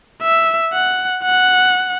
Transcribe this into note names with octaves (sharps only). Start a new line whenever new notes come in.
E5
F#5
F#5